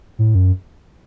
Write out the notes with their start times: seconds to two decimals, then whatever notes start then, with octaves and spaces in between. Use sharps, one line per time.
0.19 A2
0.35 F#2